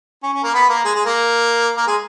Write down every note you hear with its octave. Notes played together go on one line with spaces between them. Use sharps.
C#4
C#4
A#3 A#4
B3 B4
A#3 A#4
G#3 G#4
G#3 G#4
A#3 A#4
A#3 A#4
G#3 G#4